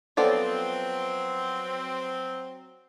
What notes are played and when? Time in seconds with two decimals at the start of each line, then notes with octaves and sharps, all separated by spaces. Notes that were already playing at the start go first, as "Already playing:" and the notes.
0.17 F3 F#3 B3 C4 A4 C#5 D5